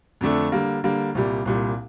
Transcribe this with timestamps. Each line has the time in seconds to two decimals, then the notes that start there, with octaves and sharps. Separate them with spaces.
0.21 F2 D3 A3 D4 A4
0.52 D3 G3 A#3
0.84 D3 G3 A#3
1.15 C2 A#2 G3
1.46 C2 A#2 G3